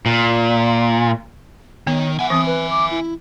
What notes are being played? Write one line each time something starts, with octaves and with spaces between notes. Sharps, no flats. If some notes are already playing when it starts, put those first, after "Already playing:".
A#2
D#3 B3 C#5
E5 F#5 G#5
E3 C4 D#6
B4
D6
E4